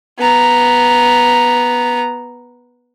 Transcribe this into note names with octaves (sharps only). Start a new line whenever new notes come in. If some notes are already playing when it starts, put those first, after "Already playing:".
B3 A#5